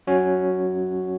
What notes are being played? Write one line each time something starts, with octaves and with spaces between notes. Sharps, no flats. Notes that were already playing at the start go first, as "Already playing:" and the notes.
F#3 C#4 F#4 C#5